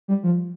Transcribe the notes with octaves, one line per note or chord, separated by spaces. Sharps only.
G3
F3